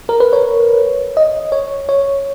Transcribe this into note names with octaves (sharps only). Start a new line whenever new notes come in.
A#4
B4
C#5
D#5
C#5
C#5